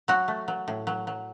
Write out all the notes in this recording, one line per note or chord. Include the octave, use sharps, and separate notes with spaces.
F#3 F#4
A3
F#3
A2
F#3
F#3